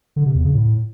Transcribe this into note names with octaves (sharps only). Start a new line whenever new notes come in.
D3
C3
E2
C#3
A2